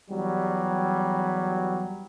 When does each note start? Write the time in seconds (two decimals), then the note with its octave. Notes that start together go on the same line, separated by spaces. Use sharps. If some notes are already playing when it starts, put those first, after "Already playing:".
0.11 E2 F#3 G3